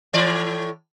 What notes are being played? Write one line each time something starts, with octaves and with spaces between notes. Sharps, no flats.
A2 E3 D5